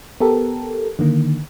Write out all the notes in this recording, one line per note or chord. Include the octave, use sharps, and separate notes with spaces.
B3 G4 A4 A#4
D3 D#3 A#3